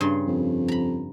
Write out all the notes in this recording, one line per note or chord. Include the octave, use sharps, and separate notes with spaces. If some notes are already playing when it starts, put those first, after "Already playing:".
G2 C#3 C6
F2
A#5 B5